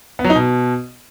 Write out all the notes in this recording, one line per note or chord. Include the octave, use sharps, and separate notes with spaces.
B3
F#3
D#4
B2